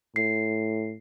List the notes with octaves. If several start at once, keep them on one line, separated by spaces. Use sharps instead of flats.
A2 C7